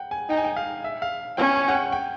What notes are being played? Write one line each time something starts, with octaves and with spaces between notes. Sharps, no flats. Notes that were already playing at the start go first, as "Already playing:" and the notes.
Already playing: F#5 G5
G#5
D#4 G5
G#5
G5
F5
E5
F5
C#4 G5
G#5
F#5
G5
G5